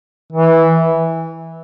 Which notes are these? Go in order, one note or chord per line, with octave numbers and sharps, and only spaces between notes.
E3